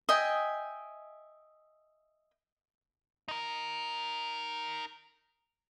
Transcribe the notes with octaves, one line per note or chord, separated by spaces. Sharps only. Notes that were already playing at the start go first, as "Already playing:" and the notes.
D#5 E5 G5 G#5
D#4 A#4